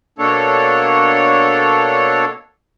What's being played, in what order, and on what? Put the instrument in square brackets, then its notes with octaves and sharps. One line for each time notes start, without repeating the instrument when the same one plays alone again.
[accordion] B2 A#3 D4 A4 C#5